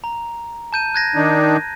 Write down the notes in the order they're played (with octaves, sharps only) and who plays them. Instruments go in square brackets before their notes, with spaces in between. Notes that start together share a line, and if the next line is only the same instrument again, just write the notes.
[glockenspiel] A#5
A5 G6 D#7
F#6 G#6 A#6
[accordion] D#3 D4 D#4